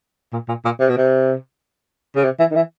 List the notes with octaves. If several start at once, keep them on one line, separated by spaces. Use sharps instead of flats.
A#2
A#2
A#2
C3
B2
C3
C#3
C3
E3
D#3
E3